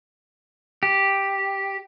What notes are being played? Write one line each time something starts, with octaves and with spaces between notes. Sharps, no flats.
G4